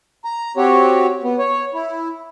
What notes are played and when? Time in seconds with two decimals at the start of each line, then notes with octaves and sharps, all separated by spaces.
0.25 A#5
0.57 C4 F#4 G4 C#5
1.24 B3
1.39 C#5
1.74 E4